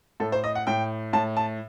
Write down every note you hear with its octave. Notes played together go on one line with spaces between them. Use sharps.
A2 A4
C5
D#5
F#5
A2 G5
A2 A5
A5